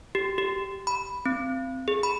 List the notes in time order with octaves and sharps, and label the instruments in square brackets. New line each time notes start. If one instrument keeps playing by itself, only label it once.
[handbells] G4
G4
B5
C4
G#4
B5